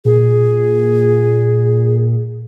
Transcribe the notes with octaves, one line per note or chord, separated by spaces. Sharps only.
A#2 G#4